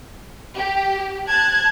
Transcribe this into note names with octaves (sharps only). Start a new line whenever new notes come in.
G4
A5 F#6 G#6